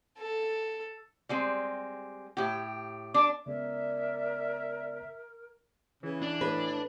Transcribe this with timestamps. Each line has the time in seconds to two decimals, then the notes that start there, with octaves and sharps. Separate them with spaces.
0.19 A4
1.29 G3 G#3 C4
2.37 A2 G4
3.14 D4 D6
3.46 C#3 G#3 B3 A#4 D5 E5
6.03 C#3 E3
6.22 D4
6.41 A2 B4